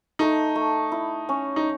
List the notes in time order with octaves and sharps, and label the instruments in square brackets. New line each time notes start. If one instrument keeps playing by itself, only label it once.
[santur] A3 [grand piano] D#4
[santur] A3
E4
C#4
[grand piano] D#4